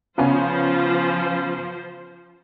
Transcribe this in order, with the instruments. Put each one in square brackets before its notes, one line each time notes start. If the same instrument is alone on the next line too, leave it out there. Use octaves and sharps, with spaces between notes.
[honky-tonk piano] C#3 B3 C#4 [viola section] F3 F4 C5